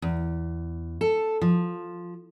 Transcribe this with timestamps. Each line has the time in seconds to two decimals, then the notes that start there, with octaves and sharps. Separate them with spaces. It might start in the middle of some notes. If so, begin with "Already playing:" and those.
0.02 E2
1.01 A4
1.42 F3